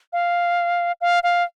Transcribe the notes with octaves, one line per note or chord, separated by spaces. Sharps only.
F5
F5
F5